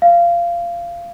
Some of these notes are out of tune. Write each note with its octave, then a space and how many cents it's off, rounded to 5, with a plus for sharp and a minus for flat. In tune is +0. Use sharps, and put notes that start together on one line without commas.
F5 -20